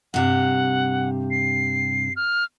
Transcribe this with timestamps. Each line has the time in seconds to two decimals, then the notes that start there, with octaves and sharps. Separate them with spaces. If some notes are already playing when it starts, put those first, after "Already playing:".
0.14 G2 C3 G4 F#5
1.31 C7
2.16 F6